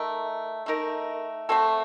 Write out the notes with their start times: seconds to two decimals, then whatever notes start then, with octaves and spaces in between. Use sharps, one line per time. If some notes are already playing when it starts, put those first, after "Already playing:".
Already playing: A3 D#4 A#4
0.66 A3 D#4 A#4
1.49 A3 C4 F#4 A4